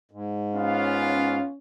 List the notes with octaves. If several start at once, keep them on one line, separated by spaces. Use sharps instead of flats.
G#2
B3 C#4 F4 F5